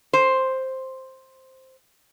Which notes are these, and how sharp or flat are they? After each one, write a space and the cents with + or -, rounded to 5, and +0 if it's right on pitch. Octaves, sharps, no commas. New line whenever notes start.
C5 +5